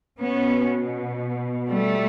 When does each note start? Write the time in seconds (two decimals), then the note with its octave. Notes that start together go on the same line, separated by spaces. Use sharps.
0.20 B2 B3 C#4
1.69 G3 A3